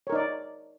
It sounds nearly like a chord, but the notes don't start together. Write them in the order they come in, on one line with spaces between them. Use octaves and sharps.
C#5 A#4 D#4 D5